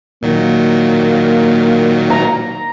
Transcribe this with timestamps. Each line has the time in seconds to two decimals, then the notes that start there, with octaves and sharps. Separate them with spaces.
0.23 A#2 D#3 F#3 A#3
2.10 A#5